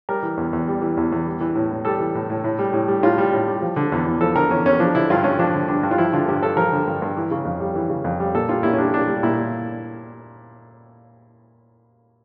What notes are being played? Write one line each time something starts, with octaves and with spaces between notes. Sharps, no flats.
G3 A#4
E3
E2
E2
G3
E3
E2
E2
G3
E3
A2
A2
G3 A4
E3
A2
A2
A2
G3
A2
G3
A2 F4
G3
A2
G3
F3
D3
E2
E2
F3 A4
D3 A#4
E2 C#4
E2 C#4
F3 D4
D3 E4
G2 F4
G2 C#4
F3 D4
D3
G2 D4
G2
F4
F3 E4
D3 F4
G2 G4
G2 A4
F3 A#4
D3
G2
G2
E3
C#3
F2
G3
E3
C#3
F2
G3
A#2 A4
G3 F4
A#2 E4
C#4
G3 D4
A#2 D4
G3
A#2 E4